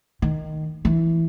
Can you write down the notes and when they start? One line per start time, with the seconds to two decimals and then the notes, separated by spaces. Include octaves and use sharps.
0.22 D#3
0.85 E3